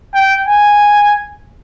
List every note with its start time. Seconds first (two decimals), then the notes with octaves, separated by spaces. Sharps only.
0.14 G5
0.47 G#5